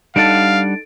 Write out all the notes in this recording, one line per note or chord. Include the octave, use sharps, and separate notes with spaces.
G3 D4 D#4 A4 F5 F#5 A6 D7